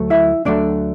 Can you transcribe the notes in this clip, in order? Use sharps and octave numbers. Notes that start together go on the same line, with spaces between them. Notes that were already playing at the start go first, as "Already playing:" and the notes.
Already playing: D2 F#3 A3
E4 E5
D2 D3 F#3 A3 D4 D5